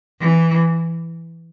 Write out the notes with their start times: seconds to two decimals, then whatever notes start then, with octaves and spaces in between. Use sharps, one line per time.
0.21 E3